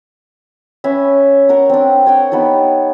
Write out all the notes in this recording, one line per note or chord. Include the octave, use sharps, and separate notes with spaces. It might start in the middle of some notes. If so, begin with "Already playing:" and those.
C#4 B4 E5
A#4 F#5 A#5
C4 D4
C#5 F#5 G5
B3 D#4 G4 A5